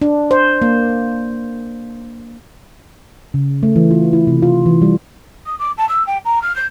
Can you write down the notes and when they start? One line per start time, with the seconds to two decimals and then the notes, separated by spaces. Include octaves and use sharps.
0.02 D4
0.31 C5
0.62 A#3
3.34 C#3
3.63 A3
3.76 E3
3.91 F4
4.13 E4
4.27 C3
4.42 F4
4.66 E3
4.82 G3
5.46 D#6
5.59 D6
5.77 A5
5.89 E6
6.07 G5
6.25 A#5
6.42 F6
6.56 G6